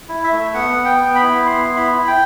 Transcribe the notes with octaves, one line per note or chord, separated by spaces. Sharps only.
E4
E5
A3
B3 F#5
B3
G5
B3
B5
E4
B3 C6
E4
B5
E4
G5